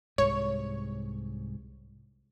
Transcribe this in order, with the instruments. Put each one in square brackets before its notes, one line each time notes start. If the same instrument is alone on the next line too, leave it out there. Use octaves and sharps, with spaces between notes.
[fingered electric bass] C2 G#2 [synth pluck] C#5